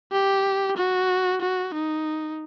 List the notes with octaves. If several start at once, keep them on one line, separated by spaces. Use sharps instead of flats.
G4
F#4
F#4
D#4